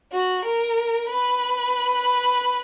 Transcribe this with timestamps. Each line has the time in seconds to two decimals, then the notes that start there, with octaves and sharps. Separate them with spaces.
0.13 F#4
0.45 A#4
1.10 B4